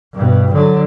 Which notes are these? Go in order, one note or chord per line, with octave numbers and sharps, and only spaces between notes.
G2 B2
D3 F#3